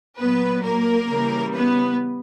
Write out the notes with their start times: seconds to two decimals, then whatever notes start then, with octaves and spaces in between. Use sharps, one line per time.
0.20 A#2 F#3 B3 B4
0.64 A#3 A#4
1.09 C#3 E3 G3
1.54 B3 B4